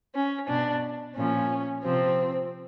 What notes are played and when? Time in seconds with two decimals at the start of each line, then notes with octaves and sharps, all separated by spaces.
0.14 C#4
0.48 B2 D4
1.16 A#2 F3 C#4
1.84 C3 F3 C4